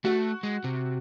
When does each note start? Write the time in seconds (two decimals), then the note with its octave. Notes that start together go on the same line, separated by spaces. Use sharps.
0.05 A3 F#4
0.43 G#3
0.64 C3